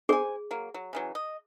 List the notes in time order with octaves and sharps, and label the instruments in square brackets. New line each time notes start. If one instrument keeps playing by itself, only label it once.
[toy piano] G#4 [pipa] C5 G#5
[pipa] F#3 A#3
F#3
C#3 E3 F#3
D#5